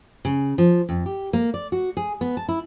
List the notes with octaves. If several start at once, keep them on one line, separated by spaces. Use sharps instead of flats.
C#3
F3
F2
G4
A#3
D5
F#4
G#4
B3
A5
E4